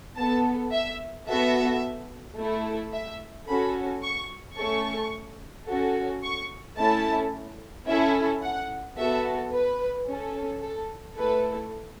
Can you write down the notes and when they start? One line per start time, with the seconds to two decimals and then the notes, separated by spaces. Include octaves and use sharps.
0.17 B3 A4 A5
0.72 E5
1.27 B3 F#4 A4 E5
2.37 A3 E4 A4
2.92 E5
3.47 C#4 F#4 A4 B5
4.02 C#6
4.57 A3 C#4 A4 C#6
5.67 C#4 F#4 A4
6.22 C#6
6.77 A3 C#4 E4 A4 A5
7.88 C#4 E4 A4 E5
8.42 F#5
8.97 B3 F#4 A4 E5
9.52 B4
10.07 C#4 A4
10.62 A4
11.17 A3 E4 A4 B4